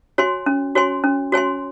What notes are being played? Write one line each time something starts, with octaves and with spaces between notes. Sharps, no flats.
F#4 C#5 G#5 C6
C#4
F#4 C#5 G#5 C6
C#4
F#4 C#5 G#5 C6